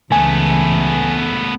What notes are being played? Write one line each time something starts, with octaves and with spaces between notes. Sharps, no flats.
C#2 E3 A3 B3 G#5